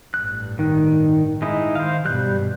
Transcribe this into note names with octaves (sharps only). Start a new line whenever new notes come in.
A1 G2 F#6
D#3
G#3 D#4 E4
D#3 C5 F5
G2 B2 G3 F#6 G6